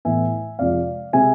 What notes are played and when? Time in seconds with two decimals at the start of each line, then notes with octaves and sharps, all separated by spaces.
0.05 A2 E3 B3 E5 G#5
0.59 F2 C3 F3 G#3 D5 F5
1.13 C3 G#3 C4 E5 G#5